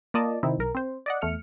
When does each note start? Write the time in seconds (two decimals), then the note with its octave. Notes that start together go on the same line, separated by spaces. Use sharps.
0.14 A#3 F4 D5 D#5 A5
0.43 C3 D#3 C4 D#4 E4
0.58 B1 A#4
0.75 C4 C5
1.06 D5 D#5 F#5
1.21 E2 A3 F6 C#7